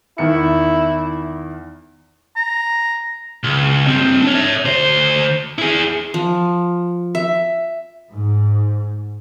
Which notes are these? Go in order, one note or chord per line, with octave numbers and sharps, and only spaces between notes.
E2 D#3 E4 C#7
A#5
C#2
G2 C4
D4 C#5
C#5 E5
D2 C5
E4 G#4
F3
E5
G#2